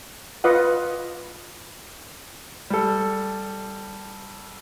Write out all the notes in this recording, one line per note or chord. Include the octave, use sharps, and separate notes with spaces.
F4 B4 D#5 F#5
G3 A4